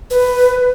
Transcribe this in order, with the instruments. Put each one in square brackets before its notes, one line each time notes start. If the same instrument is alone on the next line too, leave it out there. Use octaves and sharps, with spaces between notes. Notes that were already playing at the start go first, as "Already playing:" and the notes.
[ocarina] B4